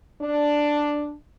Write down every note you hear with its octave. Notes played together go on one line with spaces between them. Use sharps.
D4